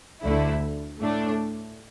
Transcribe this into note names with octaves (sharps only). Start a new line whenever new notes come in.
D2 D3 A3 E4
A2 A3 D4